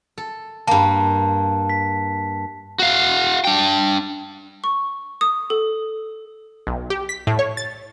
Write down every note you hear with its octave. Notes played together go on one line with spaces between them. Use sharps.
A4
G2 A#3 A5
B6
F#4 F5
D4 G5
C#6
D#6
A4
B1
G4
B6
A2
C#5
A6